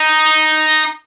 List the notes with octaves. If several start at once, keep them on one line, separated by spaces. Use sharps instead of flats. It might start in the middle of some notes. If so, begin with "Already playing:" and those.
Already playing: D#4